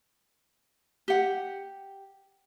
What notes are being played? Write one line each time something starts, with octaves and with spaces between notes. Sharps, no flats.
G4 F#5